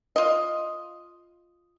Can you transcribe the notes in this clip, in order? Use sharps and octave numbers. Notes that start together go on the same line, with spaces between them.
F4 D#5